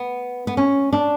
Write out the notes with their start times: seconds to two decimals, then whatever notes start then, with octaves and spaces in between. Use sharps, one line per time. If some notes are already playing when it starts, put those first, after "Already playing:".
Already playing: B3
0.47 B3
0.57 C#4
0.93 D4